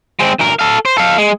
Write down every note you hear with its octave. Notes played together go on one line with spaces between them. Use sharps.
G#3 C4
D2 A#4
A4 F5
C5
A4 F5
G#3